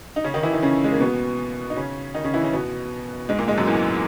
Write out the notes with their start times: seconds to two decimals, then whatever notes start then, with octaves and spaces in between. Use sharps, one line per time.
0.16 D#4
0.24 C#3 C#4
0.34 D#3 D#4
0.43 E3 E4
0.53 D#3 D#4
0.62 C#3 C#4
0.84 G#3
0.92 A#3
1.00 B2 B3
1.70 D#4
1.77 C#3 C#4
2.14 D#3 D#4
2.24 C#3 C#4
2.34 E3 E4
2.44 C#3 C#4
2.53 B2 B3
3.29 G#2 G#3
3.39 A#2 A#3
3.48 G#2 G#3
3.58 F#2 F#3
3.67 E2 E3